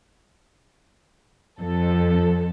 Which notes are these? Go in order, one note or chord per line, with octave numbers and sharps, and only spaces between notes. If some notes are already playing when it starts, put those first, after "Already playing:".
F2 A4